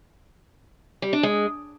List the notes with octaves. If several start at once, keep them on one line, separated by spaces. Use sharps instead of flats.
G3
D4
G#3